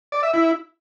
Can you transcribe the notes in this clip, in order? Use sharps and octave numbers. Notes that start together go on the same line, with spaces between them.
D5
E5
E4